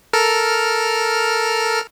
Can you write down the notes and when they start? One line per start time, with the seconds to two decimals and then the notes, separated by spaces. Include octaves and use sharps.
0.13 A4 A#4 F6